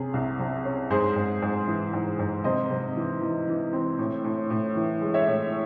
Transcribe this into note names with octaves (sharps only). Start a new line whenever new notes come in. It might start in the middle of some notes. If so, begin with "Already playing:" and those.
Already playing: C3 C#4 G#4
C2
C3
C#4
G#2 G#4 C5
G#2
G#2
E3
G#2
G#2
C3 C5 D#5
C3
E3
E3
E3
C4
A2
A2
A2
E3
G#3
C#5 E5
A2